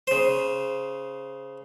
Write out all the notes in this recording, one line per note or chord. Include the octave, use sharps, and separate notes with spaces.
C#3 C5